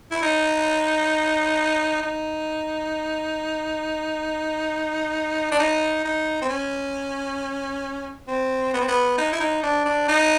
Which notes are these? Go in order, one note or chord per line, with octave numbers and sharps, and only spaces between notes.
E4
D#4
D#4
D4
D#4
D#4
C4
C#4
C4
B3
C4
B3
D#4
E4
D#4
D4
D4
D#4